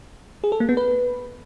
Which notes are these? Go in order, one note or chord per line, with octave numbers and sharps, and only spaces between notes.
G#4
A4
A#3
B3
B4